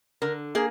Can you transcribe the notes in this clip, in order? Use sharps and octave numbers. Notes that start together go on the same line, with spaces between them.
D3 A#4
A#3 G#4